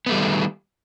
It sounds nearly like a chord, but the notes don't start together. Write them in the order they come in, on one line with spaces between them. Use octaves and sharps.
B3 A3 G3 D#3